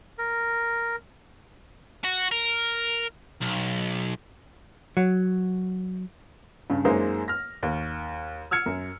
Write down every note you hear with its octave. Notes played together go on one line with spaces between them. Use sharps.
A#4
F#4
A#4
B1
F#3
G2 C#3
F#2 G#3 A#3 D#4 C5
F6 A#6
D#2
E6 F6 G#6 C#7
F#2